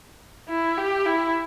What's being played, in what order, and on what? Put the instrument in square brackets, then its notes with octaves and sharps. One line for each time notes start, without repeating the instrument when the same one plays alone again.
[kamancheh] E4
G4
E4